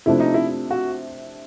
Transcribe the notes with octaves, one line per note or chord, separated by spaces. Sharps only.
C3 F3 A3 D4 E4
D#4
E4
F#4